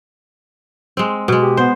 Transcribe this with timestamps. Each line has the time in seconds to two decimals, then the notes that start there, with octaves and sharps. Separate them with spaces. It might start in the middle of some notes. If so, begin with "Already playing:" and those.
0.97 G#3 C4
1.28 B2 G#3
1.42 G4
1.57 B3 C5